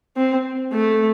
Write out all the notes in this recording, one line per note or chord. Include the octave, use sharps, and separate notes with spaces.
C4
A3